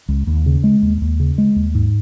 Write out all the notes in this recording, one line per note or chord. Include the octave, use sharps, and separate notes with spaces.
C#2
D#2
C#3
G#3
D#2
D#2
C#3
G#3
D#2
G#2